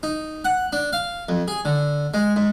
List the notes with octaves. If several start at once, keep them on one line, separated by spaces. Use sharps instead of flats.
D#4
F#5
D4
F5
F2
G#4
D3
G#3
G#2